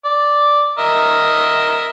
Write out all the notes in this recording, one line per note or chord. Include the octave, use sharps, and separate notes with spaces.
D5
A#4 D#5 E5